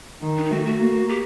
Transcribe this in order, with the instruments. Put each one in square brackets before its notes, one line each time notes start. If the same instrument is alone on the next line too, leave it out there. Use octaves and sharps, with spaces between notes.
[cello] D#3
[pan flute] D4
D#4
[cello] A3 [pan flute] F#4
[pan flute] F#4
[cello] A#3
[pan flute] G4